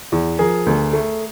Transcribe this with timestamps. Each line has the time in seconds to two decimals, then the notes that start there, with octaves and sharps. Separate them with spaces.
0.12 E2
0.39 F3 G#4 A#4
0.66 D2
0.93 A3